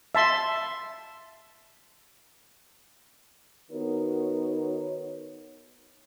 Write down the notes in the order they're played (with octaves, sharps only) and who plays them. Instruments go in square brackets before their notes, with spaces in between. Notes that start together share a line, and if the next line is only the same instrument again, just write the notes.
[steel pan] E5 A5 C6
[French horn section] D#3 B3 D#4 F#4 A#4 C#5